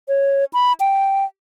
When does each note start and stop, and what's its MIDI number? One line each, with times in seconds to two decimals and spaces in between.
0.08 0.45 73
0.53 0.73 83
0.80 1.25 79